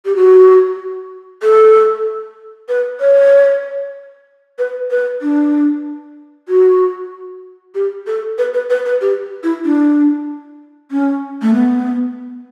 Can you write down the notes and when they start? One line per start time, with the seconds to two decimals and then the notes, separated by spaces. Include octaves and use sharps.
0.05 G4
0.16 F#4
1.43 A4
2.69 B4
3.00 C#5
4.59 B4
4.91 B4
5.22 D4
6.49 F#4
7.75 G4
8.07 A4
8.38 B4
8.54 B4
8.70 B4
8.86 B4
9.01 G4
9.44 E4
9.65 D4
10.91 C#4
11.42 A3
11.54 B3